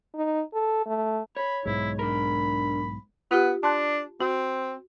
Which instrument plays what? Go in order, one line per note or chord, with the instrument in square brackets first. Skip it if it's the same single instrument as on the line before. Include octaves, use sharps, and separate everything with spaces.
[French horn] D#4
A4
A3
[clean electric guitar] C#5 [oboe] B5
[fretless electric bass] B1 G#2 G#3 [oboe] E4
[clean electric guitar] D4 A#4 [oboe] B5
[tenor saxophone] B3 [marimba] F4 G4
[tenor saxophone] D4 [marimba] A5 C6 F#6
[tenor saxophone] C4 [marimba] F#4